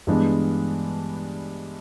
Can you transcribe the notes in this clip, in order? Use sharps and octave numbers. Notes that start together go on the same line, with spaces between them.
G2 E3 G#3 B3 D4